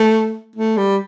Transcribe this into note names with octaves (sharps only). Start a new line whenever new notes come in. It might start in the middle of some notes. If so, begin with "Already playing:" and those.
Already playing: A3
A3
G3